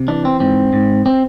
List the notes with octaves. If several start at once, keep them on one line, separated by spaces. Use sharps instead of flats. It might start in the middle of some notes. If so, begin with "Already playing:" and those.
Already playing: C3
E3 D4
C4
G#2 C4
G#2
C4